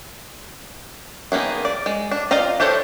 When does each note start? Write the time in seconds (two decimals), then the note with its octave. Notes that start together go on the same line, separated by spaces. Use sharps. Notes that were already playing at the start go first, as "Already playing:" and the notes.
1.32 D#3 A#3 B3 G#4
1.65 D5
1.86 G#3
2.11 D4
2.31 F4 D5 D#5 F5 A#5
2.60 D4 G4 A4 C5 C#5